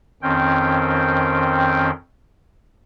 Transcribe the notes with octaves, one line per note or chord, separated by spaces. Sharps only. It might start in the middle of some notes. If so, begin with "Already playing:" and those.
F2 D#3 C4 C#4 G5